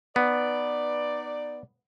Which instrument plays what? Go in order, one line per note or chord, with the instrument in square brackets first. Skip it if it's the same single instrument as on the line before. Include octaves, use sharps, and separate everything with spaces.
[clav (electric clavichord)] B3 [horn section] D#4 B4 D5